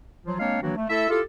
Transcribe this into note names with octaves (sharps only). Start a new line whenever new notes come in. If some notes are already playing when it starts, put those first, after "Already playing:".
F3 F#3 F4
G#3 A#3 C4 D4 C#5 F5
D#3 E3 F#3 A#3 D4 F#4
A3
A3 E4 A4 E5
E4 F4 G4 A4